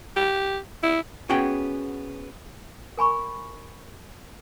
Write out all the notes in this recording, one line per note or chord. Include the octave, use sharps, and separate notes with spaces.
G4
E4
B3 C#4 F#4 G#4 G5
A#4 G#5 B5 C#6